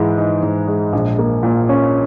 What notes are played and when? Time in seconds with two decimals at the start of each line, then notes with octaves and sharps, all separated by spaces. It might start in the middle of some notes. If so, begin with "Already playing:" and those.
Already playing: G#2 E3 G#3
0.18 D#4
0.43 G#2
0.68 G#3
0.93 A#1
1.19 A#3
1.43 A#2
1.69 C#4